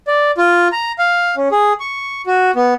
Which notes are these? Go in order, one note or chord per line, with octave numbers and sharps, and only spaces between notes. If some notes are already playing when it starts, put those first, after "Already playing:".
D5
F4
A#5
F5
C#4
G#4
C#6
F#4
B3